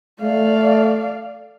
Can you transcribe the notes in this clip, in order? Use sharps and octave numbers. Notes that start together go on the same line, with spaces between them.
A3 D5 F5